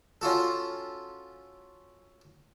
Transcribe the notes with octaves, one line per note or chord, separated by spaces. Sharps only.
C#4 F4 F#4 A4